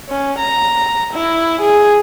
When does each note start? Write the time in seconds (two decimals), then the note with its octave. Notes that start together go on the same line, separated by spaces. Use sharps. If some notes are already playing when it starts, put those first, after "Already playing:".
0.10 C#4
0.39 A#5
1.14 E4
1.62 G#4